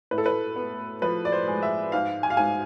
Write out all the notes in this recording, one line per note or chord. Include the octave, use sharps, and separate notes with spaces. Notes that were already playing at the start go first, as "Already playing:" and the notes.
A2 B4
A4
B4
B3
F3 B4
D5
C5
G#3
E5
G#2 F5
G#5
F5
G#2 G#5